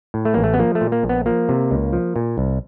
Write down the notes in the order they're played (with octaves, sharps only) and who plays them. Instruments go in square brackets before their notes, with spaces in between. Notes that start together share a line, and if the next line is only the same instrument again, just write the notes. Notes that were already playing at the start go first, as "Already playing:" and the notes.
[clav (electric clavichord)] A2
A3
A1 A#3
A3
B3
F3 A#3
A3
A#2
A#3
A#1
B3
F3 A#3
C3
C#2
F3
A#2
C2